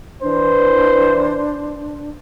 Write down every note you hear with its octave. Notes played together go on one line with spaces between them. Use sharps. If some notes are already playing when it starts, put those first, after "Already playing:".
E3 D4 B4 C5